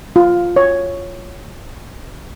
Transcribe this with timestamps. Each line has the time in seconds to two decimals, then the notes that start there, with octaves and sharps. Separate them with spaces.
0.16 F4
0.56 C#5